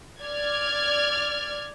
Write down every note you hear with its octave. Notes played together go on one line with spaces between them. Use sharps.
D5 F6 G#6